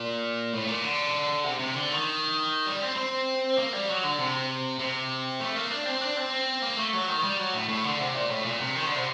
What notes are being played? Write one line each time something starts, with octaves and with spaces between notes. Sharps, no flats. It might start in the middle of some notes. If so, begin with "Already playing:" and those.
Already playing: A#2
A2
A#2
D3
C3
C3
D3
D#3
G3
C4
C4
A#3
G3
F#3
D3
C3
C3
A3
A#3
D4
C4
D4
C4
A#3
A3
F#3
D#3
G3
F#3
A2
A2
D3
C3
A#2
A2
A#2
C3
D#3
D3
C3